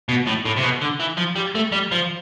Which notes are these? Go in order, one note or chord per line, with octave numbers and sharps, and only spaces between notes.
B2
A2
A2
C3
B2
D3
E3
F3
G3
A3
G3
F3